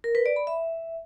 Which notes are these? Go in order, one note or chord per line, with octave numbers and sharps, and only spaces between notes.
A#4
B4
D5
B5
E5